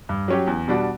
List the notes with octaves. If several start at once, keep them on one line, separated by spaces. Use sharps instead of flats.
G2
F#3 C#4 G4
E2
B2 G3 D4 F#4